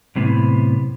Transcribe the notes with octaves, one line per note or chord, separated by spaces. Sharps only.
F#2 A2 C3 B3